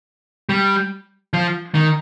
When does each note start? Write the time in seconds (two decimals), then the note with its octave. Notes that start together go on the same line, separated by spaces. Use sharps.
0.49 G3
1.33 F3
1.75 D#3